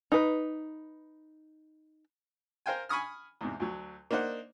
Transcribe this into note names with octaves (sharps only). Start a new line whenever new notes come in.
D#4 B4
A#4 C5 F5 G5 G#5
G#5 B5 C#6 D#6 F6
E2 G#2 C3
D2 F#3
A#3 D4 D#4 C5 F#5